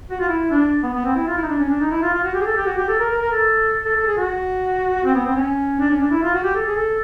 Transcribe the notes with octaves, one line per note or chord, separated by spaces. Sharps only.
F#4
F4
E4
D4
B3
B3
C4
E4
F4
E4
D#4
D4
C#4
D4
D#4
E4
F4
F4
F#4
G4
G#4
A4
G4
F#4
G4
A4
A#4
A#4
A#4
A4
A4
A4
G#4
F#4
C4
B3
C4
C#4
D4
C#4
D4
E4
F4
F#4
G4
A4
G#4
A4